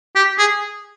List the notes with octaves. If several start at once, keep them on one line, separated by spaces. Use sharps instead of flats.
G4
G#4